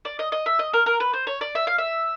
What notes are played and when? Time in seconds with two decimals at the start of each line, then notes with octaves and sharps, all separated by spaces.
0.05 D5
0.19 D#5
0.32 D#5
0.46 E5
0.59 D#5
0.73 A#4
0.86 A#4
1.00 B4
1.13 C5
1.27 C#5
1.41 D5
1.55 E5
1.67 F5
1.78 E5